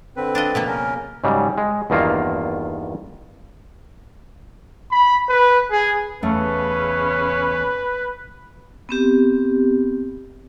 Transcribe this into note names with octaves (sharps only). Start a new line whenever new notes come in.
D3 C4 B4
D4 F4 D#5
B2 F3 A#3
C#3 C#4 A#4
G#2 C#3 F#3 G3
G#3
E2 G2 D#3 A#3 F4 F5
B5
B4
G#4
E2 C#3 A3 C#4 B4 F5
B3 C4 G4